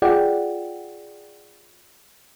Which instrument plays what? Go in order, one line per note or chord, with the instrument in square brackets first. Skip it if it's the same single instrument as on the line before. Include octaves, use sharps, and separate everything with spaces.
[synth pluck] F4 G#4 D5 F#5 G5